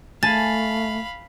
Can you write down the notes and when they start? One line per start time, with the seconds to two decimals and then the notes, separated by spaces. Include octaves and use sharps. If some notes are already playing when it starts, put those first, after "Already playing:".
0.23 A3 F5 G#5 A5 B5 A6